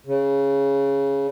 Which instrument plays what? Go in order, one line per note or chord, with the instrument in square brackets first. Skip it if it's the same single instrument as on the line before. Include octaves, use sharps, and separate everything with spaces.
[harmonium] C#3